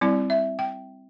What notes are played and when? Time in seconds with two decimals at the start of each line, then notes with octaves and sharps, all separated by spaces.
0.01 G3 C4 E4 D5
0.30 E5
0.59 G5